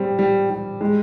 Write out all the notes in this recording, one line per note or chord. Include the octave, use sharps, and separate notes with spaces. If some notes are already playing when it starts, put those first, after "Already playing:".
Already playing: G3 C4
G3
G3
G#3